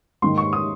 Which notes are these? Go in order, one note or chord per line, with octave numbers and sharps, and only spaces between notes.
G#2 D#3 A#3 D#4 C6
C#6
D#6